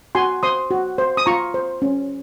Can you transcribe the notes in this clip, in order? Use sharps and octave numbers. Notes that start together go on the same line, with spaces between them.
F#4 G#5 C6
C5 C6 D#6
F#4
C5
D#6
F4 A#5 C#6
C5
C#4